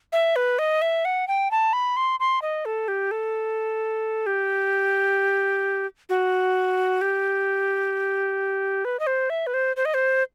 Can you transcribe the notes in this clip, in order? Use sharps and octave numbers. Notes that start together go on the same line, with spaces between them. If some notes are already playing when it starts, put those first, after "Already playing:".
E5
B4
D#5
E5
F#5
G5
A5
B5
C6
C6
D#5
A4
G4
A4
G4
F#4
G4
B4
D#5
C5
E5
B4
C5
C5
D#5
C5